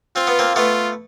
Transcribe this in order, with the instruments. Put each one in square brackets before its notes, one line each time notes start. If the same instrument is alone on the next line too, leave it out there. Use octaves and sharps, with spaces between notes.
[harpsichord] C4 [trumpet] F4
[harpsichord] B3
A#3 C4
[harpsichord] A3 B3 [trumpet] F4